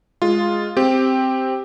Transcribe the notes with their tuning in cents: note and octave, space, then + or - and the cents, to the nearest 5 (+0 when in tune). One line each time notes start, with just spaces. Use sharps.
G#3 +0 F4 +0
C4 +0 G4 +0